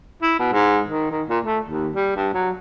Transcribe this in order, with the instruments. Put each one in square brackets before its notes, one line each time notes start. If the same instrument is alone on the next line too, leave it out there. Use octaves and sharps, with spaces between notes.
[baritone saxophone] E4
B2
G#2
D#3
D#3
A#2
A3
D#2
G3
G2
F#3